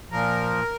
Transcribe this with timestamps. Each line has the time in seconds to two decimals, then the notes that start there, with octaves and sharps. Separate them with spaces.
0.11 A#2 F3 A#4